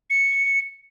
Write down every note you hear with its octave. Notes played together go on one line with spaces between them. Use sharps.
C#7